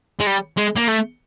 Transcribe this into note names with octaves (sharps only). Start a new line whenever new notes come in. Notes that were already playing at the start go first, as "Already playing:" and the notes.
G#3
G3
G#3
A#3
A3